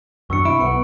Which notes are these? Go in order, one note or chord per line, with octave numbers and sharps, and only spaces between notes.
F#2 D#3 D4 C#6 E6 C#7
C3 E4 D7
B1 B3 C#7